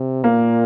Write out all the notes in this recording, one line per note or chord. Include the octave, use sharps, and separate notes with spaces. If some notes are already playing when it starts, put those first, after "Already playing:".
Already playing: C3
A#2 A#3